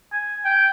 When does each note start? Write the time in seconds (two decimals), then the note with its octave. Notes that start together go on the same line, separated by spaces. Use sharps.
0.12 G#5
0.45 G5